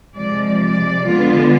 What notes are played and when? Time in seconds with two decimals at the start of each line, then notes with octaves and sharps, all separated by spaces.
0.14 C3 F3 G#3 D5
0.60 D5
1.06 D3 G#3 B3 F4